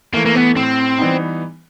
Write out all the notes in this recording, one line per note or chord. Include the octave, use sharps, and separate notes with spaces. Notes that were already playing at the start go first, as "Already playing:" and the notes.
E3 A3 A#3
A#3
B3
A2 C4
E3 G3 B3 D#4